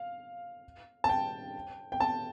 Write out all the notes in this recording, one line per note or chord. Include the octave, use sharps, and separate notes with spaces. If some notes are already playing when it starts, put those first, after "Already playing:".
Already playing: F5
A5
G5
G5
A5